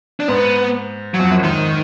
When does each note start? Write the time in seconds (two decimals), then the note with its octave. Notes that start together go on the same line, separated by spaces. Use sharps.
0.20 D4
0.28 G#2 B3
1.14 F#3
1.19 F2
1.31 F#2
1.43 G#2 D#3